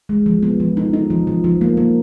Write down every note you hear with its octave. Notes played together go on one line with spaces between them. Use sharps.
G#3
F3
B3
F3
D#4
D#4
F3
F3
F3
A#3
A#3